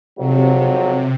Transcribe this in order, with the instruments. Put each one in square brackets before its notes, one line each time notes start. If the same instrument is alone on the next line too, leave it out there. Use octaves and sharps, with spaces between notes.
[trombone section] F2 G#2 F#3 [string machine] C3